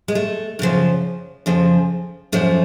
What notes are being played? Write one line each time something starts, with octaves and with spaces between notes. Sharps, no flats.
G#3
A3
F#2 C#3 F3
F2 C#3 F3
F#2 F3 A3